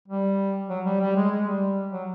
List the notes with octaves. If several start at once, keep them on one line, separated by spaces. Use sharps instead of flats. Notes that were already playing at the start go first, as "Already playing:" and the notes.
G3
F#3
G3
G3
G#3
G#3
G3
F#3